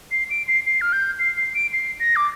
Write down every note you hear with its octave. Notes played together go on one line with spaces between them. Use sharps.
C7
D7
C7
C7
F6
G6
C7
C7
D7
C7
A#6
D6